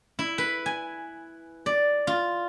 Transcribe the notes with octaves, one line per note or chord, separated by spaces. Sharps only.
E4
B4
G#5
D5
F4